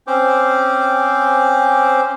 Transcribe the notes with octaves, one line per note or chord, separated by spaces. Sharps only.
C4 C#4 C5 D6